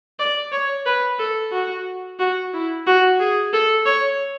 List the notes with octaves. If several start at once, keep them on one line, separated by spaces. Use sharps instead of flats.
D5
C#5
B4
A4
F#4
F#4
E4
F#4
G#4
A4
C#5